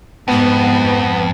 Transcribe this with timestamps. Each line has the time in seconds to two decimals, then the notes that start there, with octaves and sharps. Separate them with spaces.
0.28 F2 G#2 B3